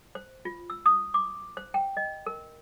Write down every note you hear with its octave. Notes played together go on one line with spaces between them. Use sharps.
C5
F4
E6
D#6
D6
C5
G5
D#5
A#4